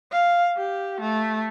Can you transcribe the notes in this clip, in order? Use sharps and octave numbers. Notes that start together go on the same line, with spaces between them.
F5
G4
A3